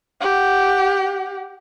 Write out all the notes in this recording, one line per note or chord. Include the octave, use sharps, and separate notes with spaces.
G4 F#5